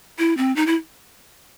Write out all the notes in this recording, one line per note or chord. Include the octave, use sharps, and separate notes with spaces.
E4
C4
D#4
E4